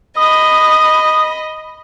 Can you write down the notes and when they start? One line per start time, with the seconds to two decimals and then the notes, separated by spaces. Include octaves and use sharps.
0.16 D#5 B5 D#6